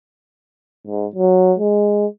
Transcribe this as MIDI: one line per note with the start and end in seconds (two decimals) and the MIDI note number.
0.87 1.06 44
1.16 1.53 54
1.59 2.06 56